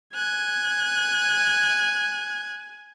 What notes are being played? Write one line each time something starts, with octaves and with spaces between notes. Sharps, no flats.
G#5 F#6 G#6